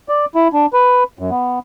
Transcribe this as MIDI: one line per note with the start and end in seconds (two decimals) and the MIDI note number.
0.09 0.26 74
0.35 0.48 64
0.53 0.66 62
0.73 1.04 71
1.19 1.30 42
1.31 1.59 59